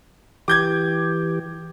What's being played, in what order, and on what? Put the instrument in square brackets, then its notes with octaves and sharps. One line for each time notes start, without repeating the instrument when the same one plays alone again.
[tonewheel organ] E3 G4 [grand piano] D6 G6 G#6